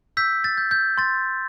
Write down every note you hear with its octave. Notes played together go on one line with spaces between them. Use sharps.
E6 G6 B6
A6
G6
G6
C6 A6